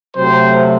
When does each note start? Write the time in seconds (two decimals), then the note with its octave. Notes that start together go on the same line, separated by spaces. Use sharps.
0.16 C3 F#3 A3 C4 C5